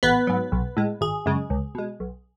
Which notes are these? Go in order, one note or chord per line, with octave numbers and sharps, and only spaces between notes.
A1 B3 B4
G#2 F#3
B1
A2 G#3
G#1 G#4
F#2 C#3 G#3
C#2
B2 G#3
B1